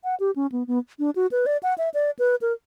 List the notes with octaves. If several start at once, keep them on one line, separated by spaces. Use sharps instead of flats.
F#5
G4
C#4
B3
B3
D4
F#4
B4
D5
F#5
E5
D5
B4
A#4